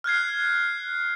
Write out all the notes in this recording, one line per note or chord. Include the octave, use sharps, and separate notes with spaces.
F6 F#6 G#6 C7